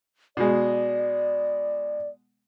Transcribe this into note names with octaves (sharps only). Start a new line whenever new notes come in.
B2 G#3 D5